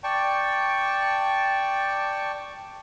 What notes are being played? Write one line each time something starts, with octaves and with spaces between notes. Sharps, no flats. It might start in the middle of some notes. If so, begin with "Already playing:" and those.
D5 G5 A5 C#6